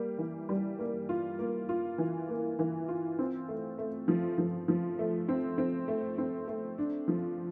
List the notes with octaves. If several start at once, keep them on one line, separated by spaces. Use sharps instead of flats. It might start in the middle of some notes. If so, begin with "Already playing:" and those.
Already playing: G3 A#3
E3
G3
A#3
F4
A#3
F4
E3
A#3
E3
F4
C4
A3
A3
F3
F3
F3
A3
C4
C4
A3
C4
A3
D4
F3